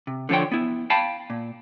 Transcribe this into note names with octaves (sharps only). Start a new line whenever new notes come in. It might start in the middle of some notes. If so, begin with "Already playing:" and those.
C3
D3 F3 D4 C#5 G5
B3 E4
F5 G5 A5 B5
A#2